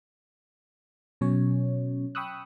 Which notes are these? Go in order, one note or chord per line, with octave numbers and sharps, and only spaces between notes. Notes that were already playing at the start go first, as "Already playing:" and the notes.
B2 F#3 C#4 C#5
G5 B5 C#6 D#6 E6 F#6